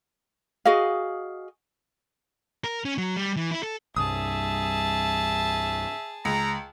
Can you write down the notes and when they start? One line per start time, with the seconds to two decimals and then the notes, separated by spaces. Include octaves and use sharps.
0.65 F#4 G#4 D#5 F5
2.64 A#4
2.85 C#4
2.98 F#3
3.17 G3
3.36 E3
3.51 E4
3.63 A4
3.96 C2 G2 G#4 E5 A5 D#6
6.25 C#2 A#5